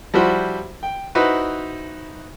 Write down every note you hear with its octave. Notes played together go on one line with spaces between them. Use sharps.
F3 G3 E4 F#4 C5
G5
D#4 E4 F#4 B4 C5